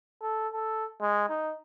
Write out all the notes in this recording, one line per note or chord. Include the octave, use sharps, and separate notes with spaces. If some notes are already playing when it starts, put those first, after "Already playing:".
A4
A4
G#3
D#4